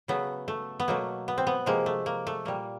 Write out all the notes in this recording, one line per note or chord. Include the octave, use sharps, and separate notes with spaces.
C#3 F#3 A3 B3
A3
B3
B2 F#3 A3 A#3
B3
C4
B3
C3 F3 G#3 A#3
A3
A#3
A3
A#2 G3 A#3